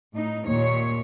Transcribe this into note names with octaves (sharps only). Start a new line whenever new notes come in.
A2 D#4
D#2 A#2 C#5